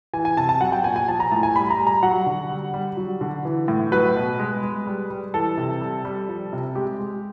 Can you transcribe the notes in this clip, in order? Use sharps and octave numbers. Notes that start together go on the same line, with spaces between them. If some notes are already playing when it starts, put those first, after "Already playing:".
E3 G#5
G#5
C3 A5
A5
F#3 F#5
G5
A#2 G#5
G#5
F3 A5
A#5
A2 A5
G#5
G3 B5
A#5
G3
A#5
F#3 F#5
D3
G3
G3
F#3
D3
E3
A2
F#3 B4
B2
G#3
G#3
G3
G3
E3 A4
C3
G3
G3
F3
C3
G#3 G4
G#3